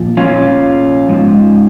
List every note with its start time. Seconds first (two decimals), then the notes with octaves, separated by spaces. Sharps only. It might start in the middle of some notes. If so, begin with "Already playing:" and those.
Already playing: A#2 F3
0.17 C#4 F4
1.09 G#2 F3